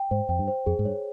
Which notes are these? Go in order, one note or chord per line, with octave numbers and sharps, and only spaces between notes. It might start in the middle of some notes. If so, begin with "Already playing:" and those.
Already playing: G5
G#2 C5
F2 G5
G2
C5
F2 G#4
G#2
G2 C#5